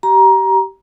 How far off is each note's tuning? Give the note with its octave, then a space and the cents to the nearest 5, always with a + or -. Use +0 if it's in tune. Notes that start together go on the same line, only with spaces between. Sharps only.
G4 -25 A#5 +20